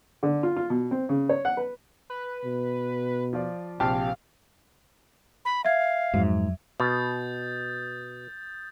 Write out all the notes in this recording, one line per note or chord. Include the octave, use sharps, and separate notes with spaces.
D3
F4
F4
B2
C4
C#3
C#5
F#5
B4
B4
B2
F3 F4 D5
A#1 C3 G4 F5 A5
B5
E5 F5 G#6
F2 G#2 F#3
B2 D#6 G6 A6